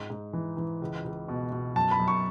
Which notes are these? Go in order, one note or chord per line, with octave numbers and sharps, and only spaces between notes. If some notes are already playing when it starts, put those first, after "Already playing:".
Already playing: G#2
G#2
E3
E3
C#2
C#2
B2
B2
F#2 A5
B5
F#2
C#6